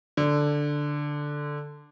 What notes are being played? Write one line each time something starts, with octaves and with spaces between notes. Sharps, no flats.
D3